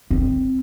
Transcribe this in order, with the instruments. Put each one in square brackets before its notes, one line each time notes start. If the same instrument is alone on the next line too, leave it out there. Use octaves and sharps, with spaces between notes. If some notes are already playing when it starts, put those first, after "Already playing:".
[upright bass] C4